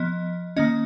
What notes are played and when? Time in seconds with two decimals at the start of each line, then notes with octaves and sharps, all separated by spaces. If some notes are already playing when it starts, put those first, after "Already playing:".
Already playing: F3 B3 D#5
0.56 D#3 A#3 C#4 D#5